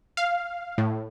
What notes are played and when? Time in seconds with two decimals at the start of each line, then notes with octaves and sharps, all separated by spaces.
0.17 F5
0.78 A2